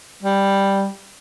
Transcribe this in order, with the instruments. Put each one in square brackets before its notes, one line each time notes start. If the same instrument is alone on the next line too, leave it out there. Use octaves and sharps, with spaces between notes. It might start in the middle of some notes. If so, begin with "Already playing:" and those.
[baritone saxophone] G3